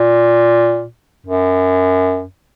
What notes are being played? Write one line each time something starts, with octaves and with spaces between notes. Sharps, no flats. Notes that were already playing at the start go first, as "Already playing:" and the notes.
Already playing: A#2
F#2